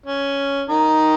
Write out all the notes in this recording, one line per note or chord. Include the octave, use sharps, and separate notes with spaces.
C#4
D#3 D#4